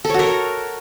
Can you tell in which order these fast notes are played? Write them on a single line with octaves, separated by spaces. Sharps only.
A4 C#5 F#4 A#4